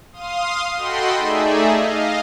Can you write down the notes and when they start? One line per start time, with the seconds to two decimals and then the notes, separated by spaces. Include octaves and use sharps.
0.12 F5 C6 D#6
0.77 F#4 A4 D#5 G5 B5 C6
1.18 A3 D#4 G#4 D5 E5
1.71 D#5 F5